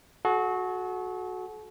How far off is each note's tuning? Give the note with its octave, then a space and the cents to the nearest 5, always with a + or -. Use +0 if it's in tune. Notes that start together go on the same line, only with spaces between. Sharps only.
F#4 -10 A4 -45